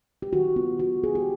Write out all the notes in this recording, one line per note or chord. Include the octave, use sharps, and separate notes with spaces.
G4
D#3 F#4
B3 F4
B3 F#4
B3 G#4
G4